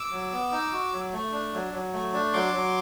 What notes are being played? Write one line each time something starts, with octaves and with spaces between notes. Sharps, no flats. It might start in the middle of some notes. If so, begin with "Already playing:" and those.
Already playing: D6 E6
F#3
B3
D#4
F#4
F#3
A3
D4
F#3
F#3
A3
D4
F#3 C6 D6
F#3